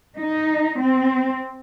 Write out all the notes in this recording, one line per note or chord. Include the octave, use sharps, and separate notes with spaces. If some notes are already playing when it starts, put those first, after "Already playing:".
D#4
C4